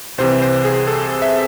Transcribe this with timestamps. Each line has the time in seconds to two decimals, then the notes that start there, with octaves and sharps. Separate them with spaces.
0.18 C2 C3 E3 C5
0.42 C5
0.65 G#4
0.87 A4
1.22 E5